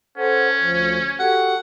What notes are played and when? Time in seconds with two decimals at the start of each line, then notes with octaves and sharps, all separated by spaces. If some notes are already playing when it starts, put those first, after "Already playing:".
0.18 C#4 A4 C5 F#5
0.60 D2 F3
1.19 F#4 G4 A4 F#5